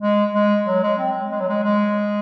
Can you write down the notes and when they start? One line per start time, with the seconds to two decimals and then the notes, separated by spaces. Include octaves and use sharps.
0.01 G#3
0.34 G#3
0.67 F#3
0.83 G#3
0.98 C4
1.31 G#3
1.40 F#3
1.49 G#3
1.63 G#3